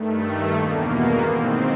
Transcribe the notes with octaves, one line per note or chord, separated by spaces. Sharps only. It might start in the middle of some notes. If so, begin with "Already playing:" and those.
Already playing: G2 D#3 A3
E2 B2 A#3
B3
G#2 D#3 C4